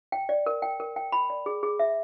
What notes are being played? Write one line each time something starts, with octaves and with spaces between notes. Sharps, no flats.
G5
D5
A#4
G5
A#4
G5
B5
D5
G#4
G#4
E5